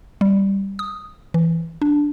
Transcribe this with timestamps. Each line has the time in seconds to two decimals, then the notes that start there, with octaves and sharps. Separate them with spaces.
0.21 G3
0.79 D#6
1.34 E3
1.82 D4